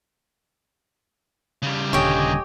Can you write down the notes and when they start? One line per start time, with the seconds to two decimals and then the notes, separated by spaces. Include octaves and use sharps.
1.62 C#3 G3
1.93 D#1 D3 G4 C#5 D#5 G#5